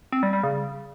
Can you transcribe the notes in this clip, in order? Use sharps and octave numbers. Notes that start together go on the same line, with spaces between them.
C4
G3
G3
C#3